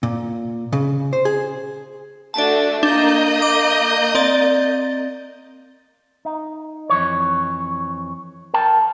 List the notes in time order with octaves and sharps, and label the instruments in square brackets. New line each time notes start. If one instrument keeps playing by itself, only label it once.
[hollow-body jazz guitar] A#2
C#3
C5
G#4
[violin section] A3 D4 F#4 [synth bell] D5 A5
[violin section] A#3 D#5 G6 [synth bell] D4
[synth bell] D6
C4 D5 A6
[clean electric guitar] D#4
F2 E3 C#5
A#4 G5 A5